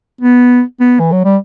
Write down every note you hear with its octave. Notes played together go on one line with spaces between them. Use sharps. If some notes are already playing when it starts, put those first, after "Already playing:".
B3
B3
E3
F#3
G3